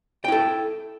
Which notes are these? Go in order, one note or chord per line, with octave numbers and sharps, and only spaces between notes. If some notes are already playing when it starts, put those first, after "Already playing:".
E4 A4 G5